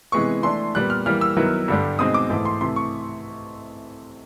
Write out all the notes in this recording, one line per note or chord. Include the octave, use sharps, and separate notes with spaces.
C3 E3 G#3 B3 C#6
E3 A3 D4 C6
A#2 G3 B3 F#6
F6
E3 G3 A#3 F6
E6
D#3 F#3 B3 E4
G2 D3 G3
B2 G#3 C4 D#4 D#6
D6
G#2 E3 A3
C6
C3 E3 A3 C6
C#6